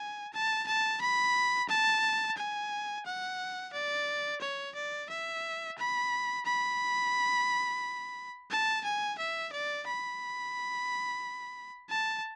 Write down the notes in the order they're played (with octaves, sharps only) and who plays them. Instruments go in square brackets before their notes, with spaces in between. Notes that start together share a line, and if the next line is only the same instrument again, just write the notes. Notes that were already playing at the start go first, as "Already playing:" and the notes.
Already playing: [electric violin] G#5
A5
A5
B5
A5
G#5
F#5
D5
C#5
D5
E5
B5
B5
A5
G#5
E5
D5
B5
A5